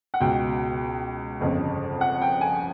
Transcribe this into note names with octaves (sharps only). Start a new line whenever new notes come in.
F#5
C#2 B2 G5
G1 F2 C#3
F#5
G5
G#5